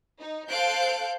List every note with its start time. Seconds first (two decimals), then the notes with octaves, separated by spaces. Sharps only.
0.19 D#4
0.48 A4 C5 F5 F#6 G6 D7